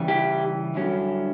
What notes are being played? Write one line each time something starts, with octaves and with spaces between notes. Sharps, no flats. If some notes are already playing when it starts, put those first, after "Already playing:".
Already playing: C#3 E3 G3
E4 G4
G2 D3 F#3 C#4 E4